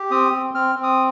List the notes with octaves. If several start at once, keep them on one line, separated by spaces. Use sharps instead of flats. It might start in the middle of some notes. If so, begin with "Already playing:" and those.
Already playing: G4
C4 D#6
C4
C4 F6
C4
D#6